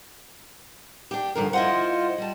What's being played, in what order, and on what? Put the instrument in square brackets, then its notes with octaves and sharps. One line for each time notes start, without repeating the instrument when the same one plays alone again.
[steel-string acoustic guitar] D4 G4
[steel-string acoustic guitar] G2 F3 A#4 [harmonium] D3
[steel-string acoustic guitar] E4 D#5 F#5 [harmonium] F4 C5
[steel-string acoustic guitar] G3 A5